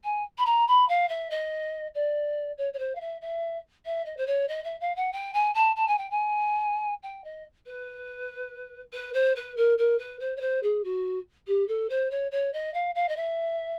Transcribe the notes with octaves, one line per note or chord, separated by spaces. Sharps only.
G#5
B5
A#5
B5
F5
E5
D#5
D5
C#5
C#5
C5
F5
E5
E5
E5
D#5
C5
C#5
D#5
E5
F5
F#5
G5
G#5
A5
A5
G#5
G5
G#5
G5
D#5
B4
B4
C5
B4
A#4
A#4
B4
C5
C#5
C5
G#4
F#4
G4
A4
C5
C#5
C#5
D#5
F5
F5
D#5
E5